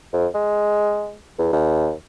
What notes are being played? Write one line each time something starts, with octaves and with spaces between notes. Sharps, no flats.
F2
G#3
E2
D#2